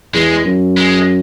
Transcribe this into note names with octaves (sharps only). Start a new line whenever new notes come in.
E2 G#3
F#2
G#3